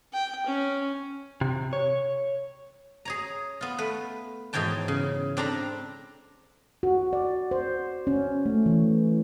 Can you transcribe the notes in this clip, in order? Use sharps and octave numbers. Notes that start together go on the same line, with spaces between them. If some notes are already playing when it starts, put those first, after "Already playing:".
G5
C#4
C3
C#5
G#4 C#5 A#5
B3 F4
A3 B4
G#2 B2 E3 C#5 G5 A5
C#3
C4 D4 A4 A#5 B5
F#4
D5
C5
C#4
A3
E3